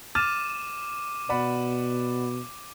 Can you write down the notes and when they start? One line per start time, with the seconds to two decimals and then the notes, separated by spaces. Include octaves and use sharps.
0.15 D6 F6 A6 D#7 E7
1.29 B2 D5 F#5 B5